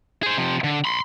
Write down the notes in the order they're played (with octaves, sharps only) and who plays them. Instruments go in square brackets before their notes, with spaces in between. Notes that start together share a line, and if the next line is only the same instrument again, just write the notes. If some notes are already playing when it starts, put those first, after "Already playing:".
[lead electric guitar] G#4 C5
C3 F3
D3
B5 C6